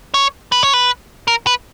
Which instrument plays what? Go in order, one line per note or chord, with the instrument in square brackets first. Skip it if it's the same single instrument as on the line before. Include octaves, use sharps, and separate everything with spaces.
[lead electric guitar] C#5
B4
C#5
B4
A#4
B4